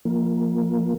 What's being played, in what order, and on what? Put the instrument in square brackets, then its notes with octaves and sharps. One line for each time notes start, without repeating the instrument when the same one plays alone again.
[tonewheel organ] F3 A#3